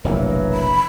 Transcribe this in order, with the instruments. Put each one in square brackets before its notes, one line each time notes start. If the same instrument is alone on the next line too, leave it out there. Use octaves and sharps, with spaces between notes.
[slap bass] F1 A#1 B2 [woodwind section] E3 F#3 [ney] A#4
[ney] B5